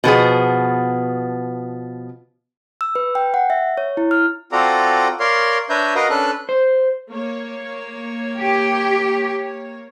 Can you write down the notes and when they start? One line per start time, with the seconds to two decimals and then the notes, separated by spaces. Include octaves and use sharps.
0.04 B2 F3 B3 G#4
2.81 E6
2.95 B4
3.15 G5
3.34 F#5
3.50 E5
3.77 C#5
3.97 E4
4.11 F6
4.52 C4 F4 F#4 A4 D5 A#5
5.20 A#4 C#5 D5 F5 C6
5.70 D4 B4 C#5 E5 A#5 G6
5.95 F#4 A#4 B4 D#5 F5 A#5
6.10 C#4 D4 A4 B4 F#6
6.49 C5
7.10 A#3 C#5
8.37 G4